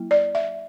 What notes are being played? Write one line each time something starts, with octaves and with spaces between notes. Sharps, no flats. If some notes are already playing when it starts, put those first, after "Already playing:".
Already playing: F#3 A#3 E4
D5
E5